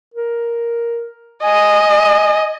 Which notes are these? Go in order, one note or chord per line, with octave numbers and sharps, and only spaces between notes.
A#4
D#5 G#5